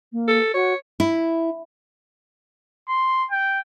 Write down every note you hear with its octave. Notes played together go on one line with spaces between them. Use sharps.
A#3
A4
F#4 C#5
E4
C6
G5